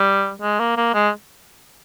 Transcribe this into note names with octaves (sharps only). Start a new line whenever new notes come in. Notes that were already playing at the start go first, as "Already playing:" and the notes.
Already playing: G3
G#3
A#3
A#3
G#3